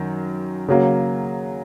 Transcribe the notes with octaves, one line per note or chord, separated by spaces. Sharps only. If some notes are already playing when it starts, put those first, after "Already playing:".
Already playing: F#2 D#3
C#3 F#3 A#3